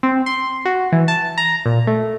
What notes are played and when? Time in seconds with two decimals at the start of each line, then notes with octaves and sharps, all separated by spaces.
0.03 C4
0.26 C6
0.65 F#4
0.92 E3
1.08 A5
1.38 A#5
1.66 A#2
1.87 A3